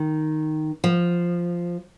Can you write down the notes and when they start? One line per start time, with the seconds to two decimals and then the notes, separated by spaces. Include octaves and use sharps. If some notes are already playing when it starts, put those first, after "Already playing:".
Already playing: D#3
0.84 F3